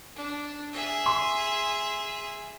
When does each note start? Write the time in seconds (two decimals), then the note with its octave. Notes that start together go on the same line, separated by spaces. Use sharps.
0.16 D4
0.73 G#4 E5
1.06 C6